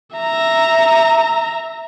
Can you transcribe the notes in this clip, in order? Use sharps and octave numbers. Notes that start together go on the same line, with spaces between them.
E5 A#5